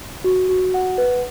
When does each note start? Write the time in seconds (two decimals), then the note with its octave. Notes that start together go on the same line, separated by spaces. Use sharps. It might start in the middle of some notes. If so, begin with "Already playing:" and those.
0.24 F#4
0.49 F#4
0.74 F#5
0.98 B4